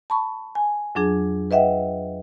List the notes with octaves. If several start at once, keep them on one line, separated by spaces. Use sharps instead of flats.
A5 B5 C#6
G#5
F2 F#3 D4 G#4
B4 D#5 E5 F#5 G5